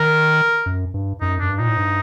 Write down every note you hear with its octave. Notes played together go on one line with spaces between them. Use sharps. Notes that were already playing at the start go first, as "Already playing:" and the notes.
Already playing: D#3 A#4
F#2
G2
F#2 D#4
F#2 D4
G2
A#2 D#4
A2
G2